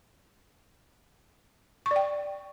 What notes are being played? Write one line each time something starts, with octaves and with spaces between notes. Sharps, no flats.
C#6
D5
G5